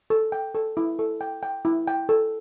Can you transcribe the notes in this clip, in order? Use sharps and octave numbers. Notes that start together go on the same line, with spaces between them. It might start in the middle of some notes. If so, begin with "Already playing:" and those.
A4
G5
A4
E4
A4
G5
G5
E4
G5
A4